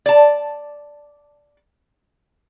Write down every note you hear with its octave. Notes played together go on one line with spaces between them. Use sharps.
D5 A5